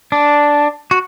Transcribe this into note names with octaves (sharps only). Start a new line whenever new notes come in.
D4
F#4